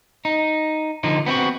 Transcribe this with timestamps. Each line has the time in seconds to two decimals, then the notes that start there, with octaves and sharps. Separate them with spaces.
0.25 D#4
1.04 D3 F3 D#4
1.26 B3 C4 E4 F#4